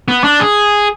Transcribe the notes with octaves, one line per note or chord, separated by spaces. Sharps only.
B3
D4
G#4